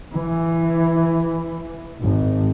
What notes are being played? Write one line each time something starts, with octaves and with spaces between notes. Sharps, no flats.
E3
G#1